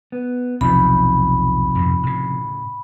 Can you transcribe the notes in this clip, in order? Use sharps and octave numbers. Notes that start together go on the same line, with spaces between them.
B3
B1 E2 A2 C3 F3 D#4 B5
F2 G#2 B2
A2 C#3